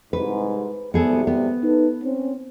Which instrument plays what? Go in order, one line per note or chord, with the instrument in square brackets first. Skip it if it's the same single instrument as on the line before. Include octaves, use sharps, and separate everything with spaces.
[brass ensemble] C2 G#2 [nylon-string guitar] B4
[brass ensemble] G#1 C3 G3 [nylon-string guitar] B3 G#4 A4
[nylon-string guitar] B3
[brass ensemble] D#4 A4 B4
C4 C#4